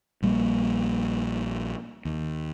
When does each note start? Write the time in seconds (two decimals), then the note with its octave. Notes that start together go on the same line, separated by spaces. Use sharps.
0.22 A#1 G3 A#3
2.05 D#2